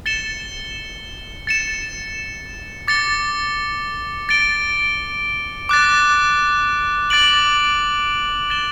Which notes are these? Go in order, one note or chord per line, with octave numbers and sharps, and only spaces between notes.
A6 C#7 E7 G7
A6 C#7 E7
D6 A6 C#7 G7
A6 D7 G7
D6 F#6 A6
D6 A6 D7 F#7
A6 E7 G7